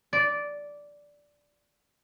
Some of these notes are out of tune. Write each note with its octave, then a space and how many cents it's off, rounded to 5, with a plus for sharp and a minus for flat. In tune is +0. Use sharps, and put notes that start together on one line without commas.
D5 -10